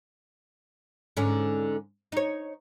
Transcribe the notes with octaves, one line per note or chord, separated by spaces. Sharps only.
G#2 D3 C#4
D#4 C#5